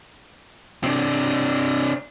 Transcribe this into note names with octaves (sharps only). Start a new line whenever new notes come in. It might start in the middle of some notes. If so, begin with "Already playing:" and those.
C3 D4